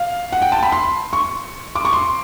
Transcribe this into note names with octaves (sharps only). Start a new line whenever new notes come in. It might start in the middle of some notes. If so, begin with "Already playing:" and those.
Already playing: F5
F#5
G5
A5
B5
C6
C#6
D6
C#6
C6